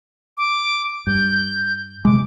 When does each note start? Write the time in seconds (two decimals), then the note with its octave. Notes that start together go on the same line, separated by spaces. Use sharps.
0.38 D6
1.07 G2 G6
2.05 C3 G#3 D6